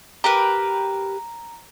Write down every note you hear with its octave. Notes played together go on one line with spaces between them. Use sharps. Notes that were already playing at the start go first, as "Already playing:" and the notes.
G4 A#4 B4 A#5